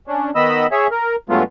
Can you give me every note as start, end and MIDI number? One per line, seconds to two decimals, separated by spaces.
0.07 0.31 61
0.07 0.31 62
0.35 0.67 51
0.35 0.67 59
0.35 0.67 75
0.35 0.67 83
0.35 0.67 88
0.71 0.87 68
0.71 0.87 73
0.71 0.87 76
0.91 1.16 70
1.29 1.43 43
1.29 1.43 54
1.29 1.43 56
1.29 1.43 57
1.29 1.43 59
1.29 1.43 65